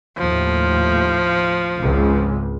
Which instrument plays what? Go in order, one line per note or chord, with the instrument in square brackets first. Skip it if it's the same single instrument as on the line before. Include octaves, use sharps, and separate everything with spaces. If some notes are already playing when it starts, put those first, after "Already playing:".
[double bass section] D#2 A2 [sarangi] F3
[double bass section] G#1 C#2 G#3